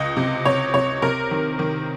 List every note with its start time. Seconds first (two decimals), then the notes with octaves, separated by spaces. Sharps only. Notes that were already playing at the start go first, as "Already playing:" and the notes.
Already playing: C#2 D#5
0.17 C3
0.45 C3 C#5
0.74 C3 C#5
1.02 C3 A#4
1.31 D#3
1.59 D#3